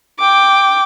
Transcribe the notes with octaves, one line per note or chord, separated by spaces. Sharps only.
G5 D6